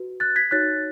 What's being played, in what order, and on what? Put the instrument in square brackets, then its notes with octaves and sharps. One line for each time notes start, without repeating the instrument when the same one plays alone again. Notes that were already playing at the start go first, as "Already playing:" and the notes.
Already playing: [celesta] F#4 B4
F#6 A6
G#6 B6
D#4 F#4 C#5 F#6 A6